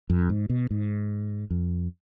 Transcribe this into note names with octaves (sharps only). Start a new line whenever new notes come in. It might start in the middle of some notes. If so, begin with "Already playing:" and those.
F2
G#2
B2
G#2
F2